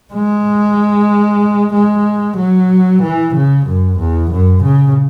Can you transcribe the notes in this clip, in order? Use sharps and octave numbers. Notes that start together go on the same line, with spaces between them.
G#3
G#3
F#3
E3
C#3
F#2
E2
F#2
C#3